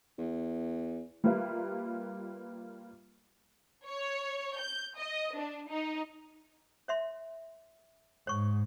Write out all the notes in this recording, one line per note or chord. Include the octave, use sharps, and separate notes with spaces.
E2
G3 A#3 F4 A#4 B4 E5
C#5
G6
D#5
D4
D#4
C#5 E5 C6
G#2 C#5 C#6